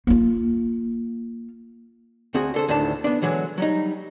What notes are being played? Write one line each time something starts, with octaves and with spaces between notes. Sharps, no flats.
A#3 F4
D2 C4 F#4 G#4
D3 A4 C5
D2 A2 D#3 D4 A5
B3 D4
D3 E3 F#3 G#3
F#3 G3 D#4